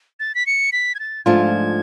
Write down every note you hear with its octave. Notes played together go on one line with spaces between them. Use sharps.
A6
B6
C#7
B6
G#6
A6
G#2 F3 A3 D4 F4 G#6